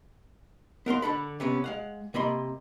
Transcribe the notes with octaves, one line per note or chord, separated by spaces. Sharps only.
B3 A#4 F5 C6
D3 D4 A4 B5
C3 B3 C#4
G#3 F5 F#5
C3 A#3 D#5 B5 C6